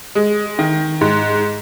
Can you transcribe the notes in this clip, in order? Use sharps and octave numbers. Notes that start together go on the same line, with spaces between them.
G#3
D#3
G#2